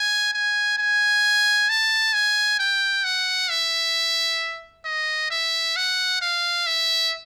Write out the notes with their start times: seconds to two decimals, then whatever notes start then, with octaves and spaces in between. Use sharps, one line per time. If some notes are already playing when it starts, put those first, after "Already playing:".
Already playing: G#5
0.33 G#5
0.78 G#5
1.69 A5
2.13 G#5
2.59 G5
3.04 F#5
3.50 E5
4.85 D#5
5.30 E5
5.76 F#5
6.22 F5
6.67 E5